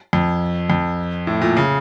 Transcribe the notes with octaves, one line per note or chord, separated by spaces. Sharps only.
F2
F2
A2
A#2
C#3